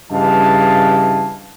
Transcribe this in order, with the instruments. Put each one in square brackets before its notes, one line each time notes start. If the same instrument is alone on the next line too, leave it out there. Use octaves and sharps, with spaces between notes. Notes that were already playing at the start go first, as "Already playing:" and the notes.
[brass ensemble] G2 C#3 E3 D#5 F5 A5